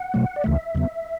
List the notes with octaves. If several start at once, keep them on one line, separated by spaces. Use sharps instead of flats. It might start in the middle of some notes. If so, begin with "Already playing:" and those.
Already playing: F#5
B2 F#3 A3
D5
D2 C#3 E3 A3 E5
E2 C#3 F#3 B3